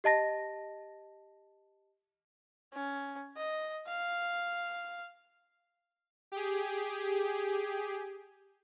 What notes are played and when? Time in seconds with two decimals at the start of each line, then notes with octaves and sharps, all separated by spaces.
0.04 G4 D#5 A5 A#6
2.73 C#4
3.37 D#5
3.88 F5
6.32 G4 G#4